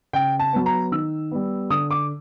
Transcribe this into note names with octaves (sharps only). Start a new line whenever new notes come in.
C#3 G5
A5
F#3 B3
A#5
D#3 E6
G3 B3
D3 D#6
D6